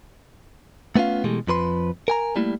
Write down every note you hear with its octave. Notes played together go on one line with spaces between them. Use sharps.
A3 B3 C#4 F4 F5
B2 E3 G#3 A3 G4
F2 F3 B4 C6
A#4 G#5 A#5
G3 A3 A#3 E4